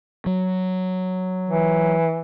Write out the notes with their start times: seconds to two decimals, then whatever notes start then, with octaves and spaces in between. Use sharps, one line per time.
0.26 F#3
1.50 E3